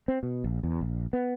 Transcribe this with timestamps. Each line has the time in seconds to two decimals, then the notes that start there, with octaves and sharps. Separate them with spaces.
0.08 C4
0.23 B2
0.44 A#1
0.63 E2
0.81 A#1
1.13 B3